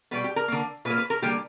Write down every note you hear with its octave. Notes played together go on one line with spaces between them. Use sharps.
B2 G3 B3 B4
G4
A#4
D3 A#3
A#2 B4
A#3
B4
A#4
D3 G3 A#3 G4